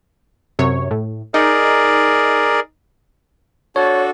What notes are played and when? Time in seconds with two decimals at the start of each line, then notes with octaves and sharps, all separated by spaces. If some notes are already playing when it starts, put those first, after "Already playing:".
0.59 F#2 C3 C#5
0.91 A2
1.34 D#4 G#4 A#4 D5
3.76 D4 F#4 A4 C#5